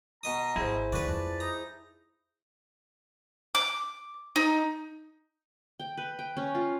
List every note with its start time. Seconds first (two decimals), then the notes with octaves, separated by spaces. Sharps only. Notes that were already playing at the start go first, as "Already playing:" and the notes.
0.23 B2 D#5 A#5 D#6
0.56 G#1 E4 G#4 C5
0.92 C#2 D#3 F#4 B4 D5
1.07 F2 A5
1.40 D#4 A#5
3.55 D6
4.36 D#4
5.80 G5
5.97 B4
6.19 G5
6.37 C#4
6.55 F4